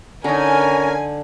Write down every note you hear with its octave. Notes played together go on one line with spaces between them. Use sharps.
D3 C#4 D#4 A#4 G#5